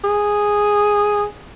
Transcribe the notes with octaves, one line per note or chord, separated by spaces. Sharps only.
G#4